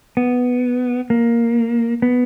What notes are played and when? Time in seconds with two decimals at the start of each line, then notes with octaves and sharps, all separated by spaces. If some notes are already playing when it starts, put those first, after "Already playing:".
0.17 B3
1.10 A#3
2.02 B3